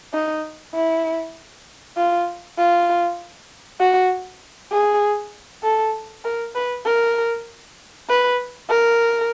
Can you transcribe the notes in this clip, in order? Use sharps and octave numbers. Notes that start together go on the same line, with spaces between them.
D#4
E4
F4
F4
F#4
G#4
A4
A#4
B4
A#4
B4
A#4